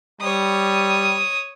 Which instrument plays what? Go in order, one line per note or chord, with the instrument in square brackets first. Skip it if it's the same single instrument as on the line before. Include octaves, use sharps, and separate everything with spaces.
[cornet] G3 [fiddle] C#5 D#6